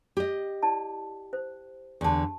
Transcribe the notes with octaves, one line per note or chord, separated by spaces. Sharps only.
G4 D#5
E4 D5 A5
C5
E2 D3 G4 A5